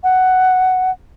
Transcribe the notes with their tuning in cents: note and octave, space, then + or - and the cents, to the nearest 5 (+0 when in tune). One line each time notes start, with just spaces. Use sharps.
F#5 +5